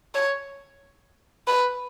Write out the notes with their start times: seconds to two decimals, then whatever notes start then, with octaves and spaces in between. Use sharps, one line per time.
0.15 C#5
1.47 B4